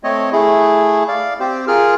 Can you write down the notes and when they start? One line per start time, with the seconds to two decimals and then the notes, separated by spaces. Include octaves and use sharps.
0.04 A3 C4 C#5 D#5
0.32 A3 E4 G#4
1.08 D5 F5
1.40 C4 G4 C5
1.67 F4 G#4 A#4 F6